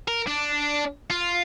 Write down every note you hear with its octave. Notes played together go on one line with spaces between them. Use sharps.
A#4
D4
F4